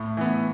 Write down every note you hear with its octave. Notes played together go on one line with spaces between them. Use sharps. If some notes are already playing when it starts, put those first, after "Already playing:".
Already playing: A2
E3 B3